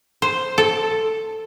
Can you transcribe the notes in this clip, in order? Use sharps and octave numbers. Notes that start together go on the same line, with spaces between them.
C5
A4